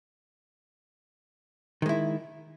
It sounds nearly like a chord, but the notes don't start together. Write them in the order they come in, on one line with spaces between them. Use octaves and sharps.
D#3 G#3 E4